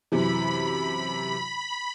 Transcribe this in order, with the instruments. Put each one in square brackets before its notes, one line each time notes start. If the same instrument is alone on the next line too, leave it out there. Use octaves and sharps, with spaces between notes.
[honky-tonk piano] F#2 C3 E3 [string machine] B5